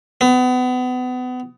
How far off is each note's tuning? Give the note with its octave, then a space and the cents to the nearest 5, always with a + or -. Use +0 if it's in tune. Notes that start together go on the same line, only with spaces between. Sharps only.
B3 +30